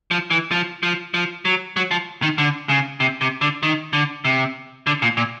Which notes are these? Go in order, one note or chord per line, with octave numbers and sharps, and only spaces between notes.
F3
E3
F3
F3
F3
F#3
F#3
F3
D#3
D3
C#3
C3
C3
D3
D#3
D3
C3
D3
A#2
A#2